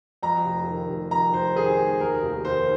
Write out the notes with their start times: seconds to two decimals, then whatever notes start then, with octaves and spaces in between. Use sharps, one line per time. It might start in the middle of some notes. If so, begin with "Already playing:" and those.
0.23 F2 A#5
0.45 F1
0.67 D#3
0.89 F1
1.11 F2 A#5
1.33 F1 C5
1.55 D#3 G#4
1.78 F1
2.00 D#2 A#4
2.23 F1
2.45 D#3 C5